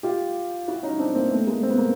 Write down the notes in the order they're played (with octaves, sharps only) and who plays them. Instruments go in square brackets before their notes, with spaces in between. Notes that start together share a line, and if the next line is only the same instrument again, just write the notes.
[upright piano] F4 G4
E4 F#4
C#4 D#4
C4 D4
A#3 C4
A3 B3
G#3 A#3
C4
B3
A#3